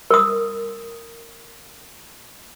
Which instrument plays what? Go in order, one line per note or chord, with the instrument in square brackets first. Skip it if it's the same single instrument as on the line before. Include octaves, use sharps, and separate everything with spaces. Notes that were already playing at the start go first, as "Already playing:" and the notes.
[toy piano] A#4 D#6